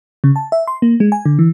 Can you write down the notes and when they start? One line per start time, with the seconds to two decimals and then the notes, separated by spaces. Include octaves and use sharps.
0.24 C#3
0.36 A5
0.52 E5
0.67 C6
0.82 A#3
1.00 G#3
1.12 G#5
1.26 D3
1.39 E3